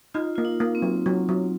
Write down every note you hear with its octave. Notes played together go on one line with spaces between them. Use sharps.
D#4 F4
A#3 F4
D#4
A#3
C4
F#3
F#3
F#3